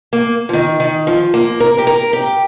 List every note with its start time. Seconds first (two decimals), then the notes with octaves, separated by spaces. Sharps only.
0.13 A#3
0.49 F3
0.53 D#3
0.80 D#3
1.07 F3
1.34 A#3
1.60 A#4
1.78 G4
1.87 A#4
2.13 G4